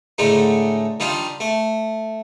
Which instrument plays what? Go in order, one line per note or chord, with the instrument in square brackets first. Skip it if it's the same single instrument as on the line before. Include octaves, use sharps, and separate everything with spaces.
[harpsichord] A2 D3 G#3 A3 D#4
D#3 G3 D4 D#4 F4
A3